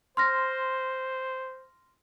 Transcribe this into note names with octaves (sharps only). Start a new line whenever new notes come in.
C5 C6 F6 A#6